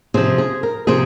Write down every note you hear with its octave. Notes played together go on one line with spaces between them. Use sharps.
C3 F3 G#4
G#4
A#4
C3 F3 G#4